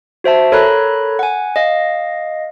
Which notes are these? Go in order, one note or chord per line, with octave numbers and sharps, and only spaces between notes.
F#4 C5 E5 A5
A4 A#4 C#5 A#5 B5 F#6
F#5 G#5
D#5 F5